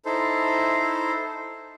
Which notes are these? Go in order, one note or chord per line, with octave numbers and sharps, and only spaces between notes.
D#4 E4 A4 C5